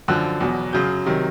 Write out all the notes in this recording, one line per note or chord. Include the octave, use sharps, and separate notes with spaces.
F#2 D3 F3 F#6
E2 B2 F#3
F#2 C#3 F#3 G6
C3 D#3 F#3